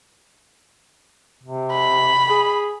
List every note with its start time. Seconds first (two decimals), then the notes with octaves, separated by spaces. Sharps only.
1.44 C3
1.72 B5
2.30 G#4